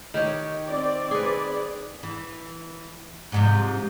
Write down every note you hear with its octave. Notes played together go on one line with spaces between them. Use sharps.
D#3 G4 C#5
C4 D5
G#4 B4
E3
G#2 C3 F3